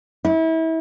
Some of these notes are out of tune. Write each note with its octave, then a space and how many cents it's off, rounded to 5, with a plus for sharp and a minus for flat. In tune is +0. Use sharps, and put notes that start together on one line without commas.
E4 -30